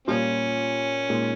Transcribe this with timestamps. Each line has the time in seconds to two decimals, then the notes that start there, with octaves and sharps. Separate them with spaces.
0.08 A#2 F3 G3 A#3 C#4 F4
1.09 A#2 G#3 D#4